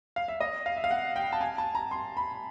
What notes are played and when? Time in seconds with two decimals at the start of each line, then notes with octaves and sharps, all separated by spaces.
0.16 F5
0.28 E5
0.40 D#5
0.66 F5
0.77 E5
0.84 F5
0.91 F#5
1.16 G5
1.33 A5
1.41 G#5
1.58 A5
1.75 A#5
1.91 C6
2.17 B5